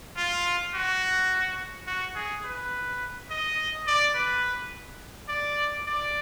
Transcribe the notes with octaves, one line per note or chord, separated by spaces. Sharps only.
F4
F#4
F#4
G#4
B4
D#5
D5
B4
D5
D5